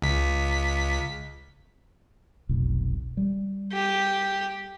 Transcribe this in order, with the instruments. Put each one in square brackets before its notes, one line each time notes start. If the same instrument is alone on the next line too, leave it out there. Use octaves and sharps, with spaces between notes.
[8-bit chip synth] C#2 B6
[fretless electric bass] F1 B1
G3
[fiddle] G4